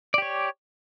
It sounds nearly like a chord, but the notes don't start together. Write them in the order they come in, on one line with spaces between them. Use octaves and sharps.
D5 G4 C#5